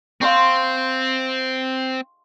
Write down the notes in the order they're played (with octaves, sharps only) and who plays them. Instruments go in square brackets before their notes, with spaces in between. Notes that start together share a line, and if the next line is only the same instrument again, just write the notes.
[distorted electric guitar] C4 [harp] F5 C6 C#6